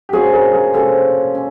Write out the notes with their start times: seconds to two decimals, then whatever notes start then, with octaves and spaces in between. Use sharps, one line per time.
0.09 G4
0.13 A#2 F3 G#3 C#4 F#4 G#4
0.33 G#4 A#4
0.53 G#4 A#4
0.74 A#2 F3 G#3 C#4 G4 A4
1.35 C#4